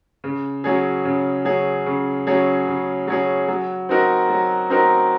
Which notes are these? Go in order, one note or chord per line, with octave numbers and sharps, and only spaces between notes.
C#3
F#3 C#4 G#4
C#3
F#3 C#4 G#4
C#3
F#3 C#4 G#4
C#3
F#3 C#4 G#4
F#3
C4 D#4 F#4 A#4
F#3
C4 D#4 F#4 A#4